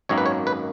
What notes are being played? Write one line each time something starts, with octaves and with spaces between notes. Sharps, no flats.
G#1 F#2 D#3 A#3 C#5
B4
C#5
B4